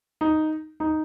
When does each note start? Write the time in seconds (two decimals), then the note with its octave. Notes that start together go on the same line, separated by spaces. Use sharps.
0.21 D#4
0.80 D#4